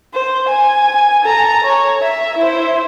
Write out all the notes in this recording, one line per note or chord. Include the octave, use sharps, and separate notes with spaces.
C5
G#5
A4 A#5
C#5
E5
E4 C5